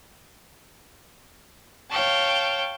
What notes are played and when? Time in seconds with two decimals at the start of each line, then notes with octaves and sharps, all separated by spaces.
1.90 C#5 F5 G5 A5